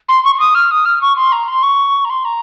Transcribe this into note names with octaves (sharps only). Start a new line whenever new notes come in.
C6
C#6
C#6
D#6
F6
D#6
F6
C#6
C6
A#5
C6
C#6
A#5
C6
A#5